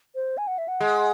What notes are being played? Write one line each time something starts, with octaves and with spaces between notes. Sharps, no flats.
C5
G#5
F#5
E5
F#5
G#3